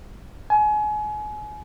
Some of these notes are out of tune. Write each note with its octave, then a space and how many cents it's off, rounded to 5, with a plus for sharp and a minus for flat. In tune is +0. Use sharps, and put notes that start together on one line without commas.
G#5 +30